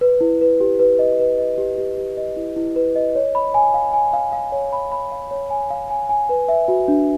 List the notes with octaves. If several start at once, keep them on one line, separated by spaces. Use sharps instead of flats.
B4
E4
B4
G4
B4
D#5
B4
D#5
G4
G4
G4
D#5
E4
E4
B4
D#5
C#5
B5
G#5
F5
G#5
F5
F5
C#5
B5
B5
F5
C#5
G#5
F5
G#5
G#5
B4
E5
F#4
D4